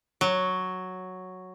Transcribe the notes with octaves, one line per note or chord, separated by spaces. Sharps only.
F#3